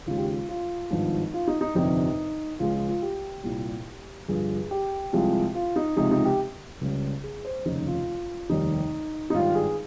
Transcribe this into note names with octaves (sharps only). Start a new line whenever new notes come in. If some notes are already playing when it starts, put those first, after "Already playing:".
D#2 C#3 G#3 F4
G4
F4
F4
G#1 G2 F3
F4
D#4
D#4
G1 F2 C3 G3 D#4
C#2 C#3 F3 G#3 F4
F4
F4
G4
C2 A#2 G3
G1 G2 F3 G#4
G4
C2 C3 F3 G#3
F4
D#4
C#2 C3 F3 G#3 D#4
D#4
G4
C#2 C#3 G3
G#4
C5
F1 D#2 C#3 D#4
F4
F1 D#2 D#3 G3 D#4
D#4
G#1 G2 G3 F4
G#4